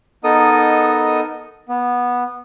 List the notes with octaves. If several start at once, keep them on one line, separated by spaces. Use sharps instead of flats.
B3 D#4 A4 A#4 D#5 D#6
B3